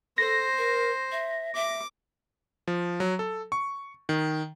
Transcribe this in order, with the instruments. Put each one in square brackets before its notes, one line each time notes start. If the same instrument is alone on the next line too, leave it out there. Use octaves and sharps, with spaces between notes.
[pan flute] A4 [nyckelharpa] C5 [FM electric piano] A#6
[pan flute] A#4
E5
[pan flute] E5 [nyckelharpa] D6
[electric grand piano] F3
F#3
A4
C#6
D#3